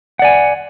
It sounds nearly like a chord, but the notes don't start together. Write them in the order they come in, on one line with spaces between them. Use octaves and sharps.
F#5 D5 G#5